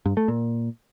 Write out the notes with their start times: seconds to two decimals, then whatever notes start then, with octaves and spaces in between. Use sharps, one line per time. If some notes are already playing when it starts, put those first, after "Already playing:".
0.06 G2
0.17 A3
0.28 A#2